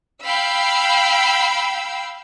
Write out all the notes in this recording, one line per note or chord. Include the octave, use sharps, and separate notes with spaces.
F5 G5 B5 E6